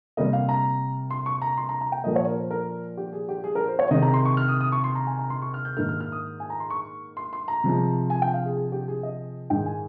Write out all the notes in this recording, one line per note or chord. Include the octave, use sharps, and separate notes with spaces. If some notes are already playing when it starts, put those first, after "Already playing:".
C3 G3 A#3 D#5
F5
A#5
C6
C#6
A#5
C6
A#5
A#5
G5
A#2 F3 A#3 D#5
C#5
A#4
C5
A#4
G4
G#4
G4
G#4
A#4
C5
C#5
C3 D#3 G#3 D#5
A#5
C6
C#6
F6
D#6
D#6
C#6
C6
A#5
G#5
A#5
C6
C#6
F6
G6
G#2 D#3 A#3 F6
F6
F6
D#6
G#5
A#5
C6
C#6
C6
C6
A#5
C3 F3 G#3
G#5
G5
F5
G#4
G#4
G4
G#4
D#5
G#2 D#3 G#3 G5
G#5